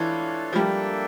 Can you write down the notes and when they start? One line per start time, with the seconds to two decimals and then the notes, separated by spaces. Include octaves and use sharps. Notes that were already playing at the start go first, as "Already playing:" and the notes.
Already playing: E3 D4 F4 A4 C#5 F5
0.53 F3
0.56 G3 A#3 D4 A4 E5 G5